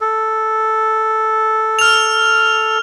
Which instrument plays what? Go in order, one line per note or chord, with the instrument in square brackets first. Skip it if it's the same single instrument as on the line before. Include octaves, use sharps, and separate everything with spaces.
[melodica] A4
[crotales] F6 F7